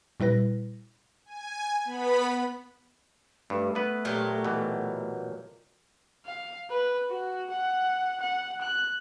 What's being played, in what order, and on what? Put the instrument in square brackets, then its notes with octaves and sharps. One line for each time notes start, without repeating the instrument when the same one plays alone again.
[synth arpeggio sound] A#2 G3 E4 B4 A#6
[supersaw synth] G#5
B3 B5
[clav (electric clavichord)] G2 [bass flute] A3
[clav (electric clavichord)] B3 B4
[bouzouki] A#2 F#3 G4
[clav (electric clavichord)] B2 E3
[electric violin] F5
B4
F#4
F#5
F#5
F#6